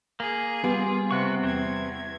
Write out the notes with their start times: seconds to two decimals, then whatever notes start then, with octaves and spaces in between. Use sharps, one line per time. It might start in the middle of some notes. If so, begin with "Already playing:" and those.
0.20 A#3 G#4
0.64 G3 B3 F4
1.11 C3 B4 F#5 C#6
1.43 E2 C4 G#6